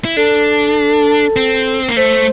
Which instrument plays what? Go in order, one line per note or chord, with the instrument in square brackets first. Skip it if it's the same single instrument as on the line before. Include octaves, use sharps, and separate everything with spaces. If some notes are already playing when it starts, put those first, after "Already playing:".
[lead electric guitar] E4
[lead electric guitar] D4 [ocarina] A4
[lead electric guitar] C4
A#3
[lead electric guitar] A3 [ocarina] C5